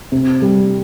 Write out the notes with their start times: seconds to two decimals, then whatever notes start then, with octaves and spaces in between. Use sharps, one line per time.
0.12 C3
0.42 G3